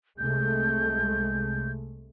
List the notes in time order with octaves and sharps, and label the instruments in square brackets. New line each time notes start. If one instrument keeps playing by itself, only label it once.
[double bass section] C2 G#3 A3 [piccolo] G6